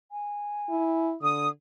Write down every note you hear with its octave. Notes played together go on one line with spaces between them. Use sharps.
G#5
E4
D3 D#6